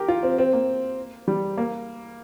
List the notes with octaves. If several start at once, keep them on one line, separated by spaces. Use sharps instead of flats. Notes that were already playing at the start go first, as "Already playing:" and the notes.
Already playing: G4 A#4
F4
C4
C4
A#3
G3
A#3